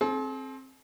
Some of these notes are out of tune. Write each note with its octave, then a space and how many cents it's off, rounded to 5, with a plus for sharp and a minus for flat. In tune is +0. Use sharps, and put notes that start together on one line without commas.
C4 +20 A4 -45